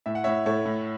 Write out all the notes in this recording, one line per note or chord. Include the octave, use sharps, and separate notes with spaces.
A2 E5
F#5
A2 C#5 E5
A2 A4 C#5
A2